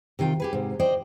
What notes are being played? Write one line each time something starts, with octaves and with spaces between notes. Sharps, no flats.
C3 D#3 F4 G5
G4 G#4 B4
G#2 C3
C5 D5 D#5 G5